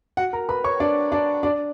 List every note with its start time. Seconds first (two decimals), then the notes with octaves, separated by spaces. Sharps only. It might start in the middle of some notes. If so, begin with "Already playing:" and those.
0.17 F#4 F#5
0.33 A#4 A#5
0.49 B4 B5
0.64 C#5 C#6
0.80 D4 D5
1.12 D4 D5
1.43 D4 D5